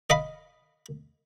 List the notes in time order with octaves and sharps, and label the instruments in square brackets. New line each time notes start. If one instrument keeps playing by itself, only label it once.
[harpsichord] D#5 F5 B5